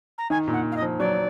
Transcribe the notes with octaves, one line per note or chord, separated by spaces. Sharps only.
A#5
D#3 G#5
A#2
F#5
F5
D#5
F3
F#3 D5